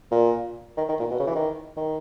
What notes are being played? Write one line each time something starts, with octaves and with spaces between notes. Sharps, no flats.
A#2
D#3
D#3
A#2
B2
C#3
E3
D#3
D#3